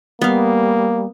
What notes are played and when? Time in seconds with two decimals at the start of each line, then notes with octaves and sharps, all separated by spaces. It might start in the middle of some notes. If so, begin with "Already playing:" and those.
0.21 G3 A#3 B3 F5